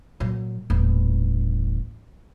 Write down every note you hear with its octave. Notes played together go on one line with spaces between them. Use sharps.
A#2 F#3
D#1 A1